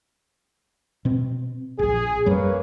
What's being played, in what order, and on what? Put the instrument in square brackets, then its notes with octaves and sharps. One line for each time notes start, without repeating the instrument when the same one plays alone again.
[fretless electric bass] B2 C4
[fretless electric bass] E1 A#1 [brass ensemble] G#4
[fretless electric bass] F#2 G3 [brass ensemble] A#3 B4 C#5